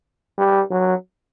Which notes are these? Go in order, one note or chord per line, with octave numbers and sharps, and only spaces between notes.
G3
F#3